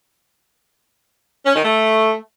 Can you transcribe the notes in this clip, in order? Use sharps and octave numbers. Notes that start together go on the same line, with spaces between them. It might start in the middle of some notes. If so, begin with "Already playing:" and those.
C#4
D#3
A3